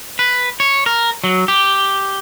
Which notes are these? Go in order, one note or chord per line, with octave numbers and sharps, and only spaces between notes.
B4
C#5
A#4
F#3
G4